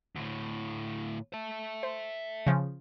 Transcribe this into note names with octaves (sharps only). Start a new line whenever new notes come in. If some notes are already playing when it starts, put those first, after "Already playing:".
D2 A2
E5 A5
C5
C#3 F3